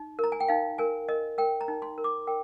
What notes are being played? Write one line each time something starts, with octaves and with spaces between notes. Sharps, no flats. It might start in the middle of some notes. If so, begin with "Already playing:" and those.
Already playing: D#4
A#4 A#5
G#5
G5
D#4 F5
A#4 G#5
A#4 D#5
A#4 G5
A#5
D#4
C6
A#4
D6
A#4 G5